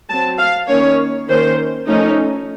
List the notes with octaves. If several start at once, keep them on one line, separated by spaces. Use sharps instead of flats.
F#3 C4 A5
F5
D#3 A#3 C#4 C#5
D#3 A#3 C#4 C5
F3 A3 C#4 D#4